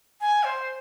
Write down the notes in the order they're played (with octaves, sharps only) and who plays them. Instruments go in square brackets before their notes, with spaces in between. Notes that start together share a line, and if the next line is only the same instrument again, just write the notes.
[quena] G#5
C5